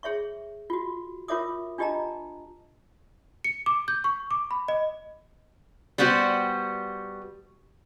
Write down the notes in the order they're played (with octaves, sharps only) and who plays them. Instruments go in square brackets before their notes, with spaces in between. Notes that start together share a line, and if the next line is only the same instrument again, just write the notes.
[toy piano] G#4 C#5 E5 C#6
F4 F#4
F4 A#4 C#5 E5 D6 D#6
D4 F4 G4 D#5 A5 A#5
[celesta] C#7
D6
G6
C#6
D6
B5
D#5
[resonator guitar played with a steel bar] G3 B3 F#4 G4 C5